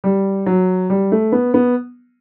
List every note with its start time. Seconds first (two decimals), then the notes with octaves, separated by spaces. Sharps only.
0.04 G3
0.46 F#3
0.90 G3
1.12 A3
1.32 B3
1.54 B3